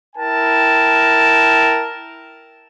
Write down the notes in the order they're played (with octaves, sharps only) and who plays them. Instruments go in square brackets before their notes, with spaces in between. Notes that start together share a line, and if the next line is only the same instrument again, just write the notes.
[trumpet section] E4 A#4 G5 A5